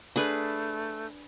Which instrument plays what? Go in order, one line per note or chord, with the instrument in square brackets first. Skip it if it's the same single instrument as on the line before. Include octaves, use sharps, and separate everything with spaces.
[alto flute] A3 [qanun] D4 G#4 B4